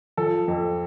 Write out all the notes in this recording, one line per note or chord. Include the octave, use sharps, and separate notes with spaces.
F3 A4
F2